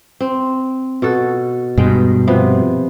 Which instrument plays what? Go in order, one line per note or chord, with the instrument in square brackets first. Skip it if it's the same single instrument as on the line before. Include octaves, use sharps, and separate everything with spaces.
[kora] C4
B2 F#4 A4
[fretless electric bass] G2 B2 [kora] G#3 G5
[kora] C3 F3 B3